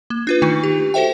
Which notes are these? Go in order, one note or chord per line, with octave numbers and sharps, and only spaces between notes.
A#3
D4 F4 B4
D#3 A3 D#4
G4
F#4 A4 C5 E5 G5